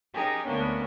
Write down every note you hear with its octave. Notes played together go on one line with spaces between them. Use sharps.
C#4 D#4 G4 G#4 A#4
D2 A#3 B3 C#4 D4